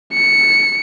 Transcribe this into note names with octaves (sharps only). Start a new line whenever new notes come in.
C#7